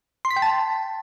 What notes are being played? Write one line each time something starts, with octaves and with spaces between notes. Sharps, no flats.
C6
B6
G5
A5